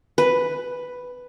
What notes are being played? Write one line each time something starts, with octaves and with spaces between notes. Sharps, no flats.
B4